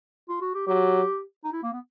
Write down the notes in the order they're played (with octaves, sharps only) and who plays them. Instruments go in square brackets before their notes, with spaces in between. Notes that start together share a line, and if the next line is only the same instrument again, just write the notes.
[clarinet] F4
F#4
G4
[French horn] F#3 [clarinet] G4
[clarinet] D#4
E4
A#3
B3